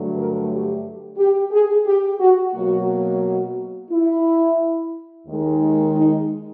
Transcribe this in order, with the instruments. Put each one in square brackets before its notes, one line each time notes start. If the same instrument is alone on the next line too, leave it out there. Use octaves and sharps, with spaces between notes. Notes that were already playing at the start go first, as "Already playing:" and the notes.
Already playing: [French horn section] G2 D3 F#3 A3
A#4
G4
G4
G#4
G4
F#4
B2 F#3 A#3 F#4
F#4
E4
D#2 D#3 G#3
D#4